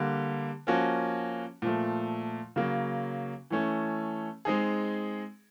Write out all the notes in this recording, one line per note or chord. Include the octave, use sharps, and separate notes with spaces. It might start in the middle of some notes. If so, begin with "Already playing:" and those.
Already playing: D3 G3 A#3
F3 A#3 C#4 F#4
A#2 F3 A3
C#3 F#3 A#3
E3 A3 C#4
G#3 C4 D#4 G#4